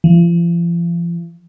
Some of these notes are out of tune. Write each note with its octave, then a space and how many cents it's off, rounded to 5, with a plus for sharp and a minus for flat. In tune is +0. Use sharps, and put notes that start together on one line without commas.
F3 -40